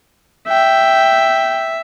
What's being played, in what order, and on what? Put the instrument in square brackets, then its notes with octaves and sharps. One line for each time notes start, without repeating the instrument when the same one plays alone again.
[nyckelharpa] E5 [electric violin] G5